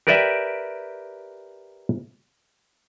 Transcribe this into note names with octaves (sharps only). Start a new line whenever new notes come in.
G4 A#4 B4 D5 E5 G5